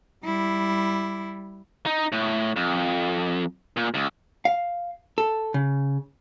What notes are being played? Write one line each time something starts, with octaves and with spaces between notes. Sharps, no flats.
G3 E4
D#4
A2
F2
A#2
C#2
F5
A4
C#3